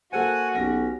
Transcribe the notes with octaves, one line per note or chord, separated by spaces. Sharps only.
A#3 F#4 A4 C5 F#5 G#5
B1 C#4 G4 A#6